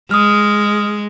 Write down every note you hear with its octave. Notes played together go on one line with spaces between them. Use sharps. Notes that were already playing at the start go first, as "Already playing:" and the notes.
G#3 D#6 F6